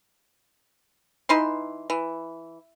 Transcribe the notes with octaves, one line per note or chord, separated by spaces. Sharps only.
E3 D#4 B4 C6
E3